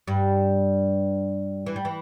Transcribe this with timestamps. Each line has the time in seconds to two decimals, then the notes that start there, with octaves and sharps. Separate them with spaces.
0.07 G2 G3
1.66 E3
1.76 G3
1.85 E3